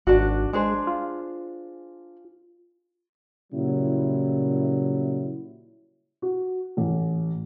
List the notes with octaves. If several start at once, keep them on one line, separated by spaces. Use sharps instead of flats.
G#1 D4 F#4
G#3 D4 G#4 C5
F4
A#2 C#3 F#3 G3 E4
F#4
A1